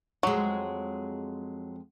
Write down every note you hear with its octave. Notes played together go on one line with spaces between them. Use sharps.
F2 F#3 G#3